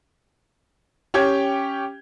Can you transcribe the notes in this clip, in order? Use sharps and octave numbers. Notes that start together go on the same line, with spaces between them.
C#4 G4 G5 G#6